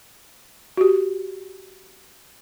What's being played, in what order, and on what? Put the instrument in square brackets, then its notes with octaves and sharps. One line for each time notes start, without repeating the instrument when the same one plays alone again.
[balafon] F#4 G4